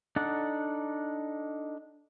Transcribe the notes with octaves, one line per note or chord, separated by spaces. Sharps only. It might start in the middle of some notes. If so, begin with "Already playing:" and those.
D4 D#4 A4 F#5